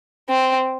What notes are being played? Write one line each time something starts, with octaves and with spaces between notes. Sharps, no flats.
C4